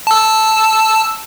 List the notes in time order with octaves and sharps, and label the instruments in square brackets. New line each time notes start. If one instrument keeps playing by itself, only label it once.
[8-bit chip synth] A5 E6